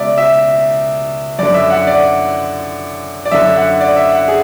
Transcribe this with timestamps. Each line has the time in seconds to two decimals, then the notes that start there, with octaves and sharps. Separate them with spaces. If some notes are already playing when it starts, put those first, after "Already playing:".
Already playing: C#2 B2 D5 E5
0.18 E5
1.39 F#2 D3 D5
1.54 E5
1.70 F#5
1.87 D5
3.25 D5
3.31 F#2 D3 E5
3.56 F#5
3.80 D5
3.96 E5
4.12 F#5
4.28 G#4